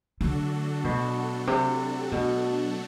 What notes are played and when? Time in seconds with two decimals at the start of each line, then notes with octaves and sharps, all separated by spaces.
0.21 D3 F#3 A3 D4 F#4 A4
0.84 B2
1.47 C3
2.12 B2